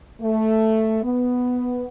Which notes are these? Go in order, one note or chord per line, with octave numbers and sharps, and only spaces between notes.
A3
B3